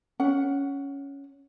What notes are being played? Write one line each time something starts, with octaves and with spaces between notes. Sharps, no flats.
C#4 F#5